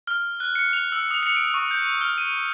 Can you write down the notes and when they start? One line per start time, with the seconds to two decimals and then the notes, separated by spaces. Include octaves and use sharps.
0.07 F6
0.40 F#6
0.55 C#7
0.73 F7
0.92 E6
1.11 D#6
1.23 C#7
1.36 D7
1.54 C#6
1.71 G6
2.01 F6
2.18 D#7